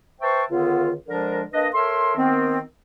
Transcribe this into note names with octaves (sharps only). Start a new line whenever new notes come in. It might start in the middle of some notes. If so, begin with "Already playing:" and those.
B4 C5 E5 G5 A5 C#6
C#2 D3 D#3 B3 F4
D3 F3 G#3 D4 A#4
A#3 D4 B4 D#5
A4 A#4 C#5 E5 C6
D#3 B3 C4